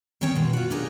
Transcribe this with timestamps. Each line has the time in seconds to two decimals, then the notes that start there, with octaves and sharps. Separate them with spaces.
0.21 D#3 C4 C#4 C#5 G5 A5
0.36 B2 G#3
0.53 F4 F#4
0.70 D4 D#4 G4 G#4 A#4